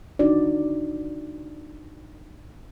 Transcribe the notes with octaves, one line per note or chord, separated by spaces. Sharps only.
D4 D#4 F#4 D5